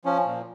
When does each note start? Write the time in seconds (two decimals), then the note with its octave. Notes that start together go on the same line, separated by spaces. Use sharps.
0.05 F3 C#4
0.25 A#2